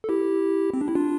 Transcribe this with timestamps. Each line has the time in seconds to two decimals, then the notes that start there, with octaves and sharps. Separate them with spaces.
0.04 A4
0.09 E4 G4
0.74 C4
0.81 D4
0.88 E4
0.95 D4 F4